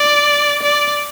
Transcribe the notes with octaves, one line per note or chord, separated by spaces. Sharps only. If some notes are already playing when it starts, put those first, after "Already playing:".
Already playing: D5
D5